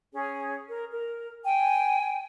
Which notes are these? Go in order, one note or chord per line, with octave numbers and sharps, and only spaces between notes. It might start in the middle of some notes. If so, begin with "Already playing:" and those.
C#4 G#4
A#4
A#4
G5 G#5